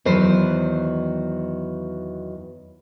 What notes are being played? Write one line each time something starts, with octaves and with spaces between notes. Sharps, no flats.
E2 D#3 F#3 B4 C5